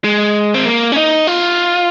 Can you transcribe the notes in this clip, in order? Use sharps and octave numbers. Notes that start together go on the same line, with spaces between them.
G#3
C4
A#3
C#4
D#4
F4